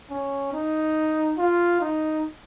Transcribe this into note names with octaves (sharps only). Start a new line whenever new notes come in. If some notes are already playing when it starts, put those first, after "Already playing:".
C#4
D#4
F4
D#4